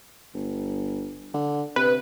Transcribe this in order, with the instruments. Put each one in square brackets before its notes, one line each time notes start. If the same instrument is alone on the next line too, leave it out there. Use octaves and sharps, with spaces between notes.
[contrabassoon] G1
D3
[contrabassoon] C3 [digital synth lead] B4